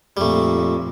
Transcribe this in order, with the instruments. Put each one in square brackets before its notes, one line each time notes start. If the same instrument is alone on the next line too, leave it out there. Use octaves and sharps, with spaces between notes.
[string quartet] F2 A#2 [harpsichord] G3 A3